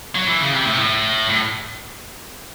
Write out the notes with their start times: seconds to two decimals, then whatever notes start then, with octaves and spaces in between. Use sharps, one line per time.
0.15 F#3
0.28 E3
0.40 C#3
0.53 C3
0.65 A2
0.73 C3
0.79 A2
1.29 A2